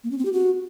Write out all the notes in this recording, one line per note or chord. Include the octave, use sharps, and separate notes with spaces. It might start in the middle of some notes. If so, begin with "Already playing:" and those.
A#3
C#4
C4
G4
F#4